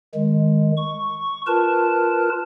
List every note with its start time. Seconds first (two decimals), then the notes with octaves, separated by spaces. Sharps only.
0.15 D#3 G#3
0.77 C#6
1.47 F4 A#4 B4 A5